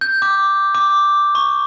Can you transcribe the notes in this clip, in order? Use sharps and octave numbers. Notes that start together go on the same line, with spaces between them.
G6
D6
D6
C#6